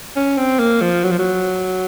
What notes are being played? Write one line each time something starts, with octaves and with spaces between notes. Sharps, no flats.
C#4
C4
A#3
F3
F#3
F3
F#3